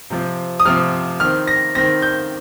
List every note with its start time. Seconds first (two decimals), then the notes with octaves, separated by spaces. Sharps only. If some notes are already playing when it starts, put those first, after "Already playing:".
0.10 C3 F3 C4
0.60 D#6
0.65 C3 F3 C4 F6
1.20 D#3 C4 F6
1.47 A#6
1.75 D#3 C4 A#6
2.02 G6